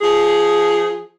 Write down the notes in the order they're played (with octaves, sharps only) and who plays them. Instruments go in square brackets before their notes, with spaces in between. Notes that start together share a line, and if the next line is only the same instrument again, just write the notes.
[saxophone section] F3 G#4